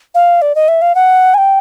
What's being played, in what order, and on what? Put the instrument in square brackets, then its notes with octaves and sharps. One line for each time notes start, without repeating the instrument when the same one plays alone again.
[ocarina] F5
D5
D#5
E5
F5
F#5
G#5
G5